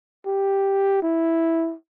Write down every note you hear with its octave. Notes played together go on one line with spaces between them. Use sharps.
G4
E4